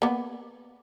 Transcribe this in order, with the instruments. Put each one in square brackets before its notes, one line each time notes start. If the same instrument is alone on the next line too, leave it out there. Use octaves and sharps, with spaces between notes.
[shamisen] A#3 B3